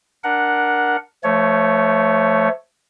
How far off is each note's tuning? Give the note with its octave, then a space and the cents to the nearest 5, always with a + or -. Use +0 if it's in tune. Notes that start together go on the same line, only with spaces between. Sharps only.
D4 +0 A#4 +10 F#5 +0
F3 -25 A3 +0 C#5 +5